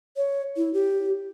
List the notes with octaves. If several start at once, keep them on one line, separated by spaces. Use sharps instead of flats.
C#5
E4
G4